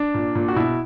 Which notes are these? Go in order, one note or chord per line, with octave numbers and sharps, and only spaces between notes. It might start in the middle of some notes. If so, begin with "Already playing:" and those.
Already playing: D4
A#2
A#2
F#4
B2 E4